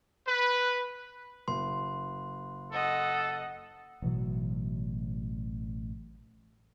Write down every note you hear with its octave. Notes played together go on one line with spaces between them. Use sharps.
B4
F#1 C6
A4 D#5 F#5
A1 B2 E3 F#3